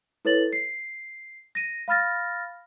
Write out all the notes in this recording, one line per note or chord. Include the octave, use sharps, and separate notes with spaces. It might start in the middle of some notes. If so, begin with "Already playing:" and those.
E4 A4 B4 C#5 A6 F#7
C7
A#6 D#7
F5 B5 F6 A6 A#6